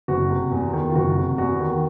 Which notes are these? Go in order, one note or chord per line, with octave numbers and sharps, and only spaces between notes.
F#1 F#4
C3
E2
D#3
F4
F#1 F#4
C3
E2 F#4
D#3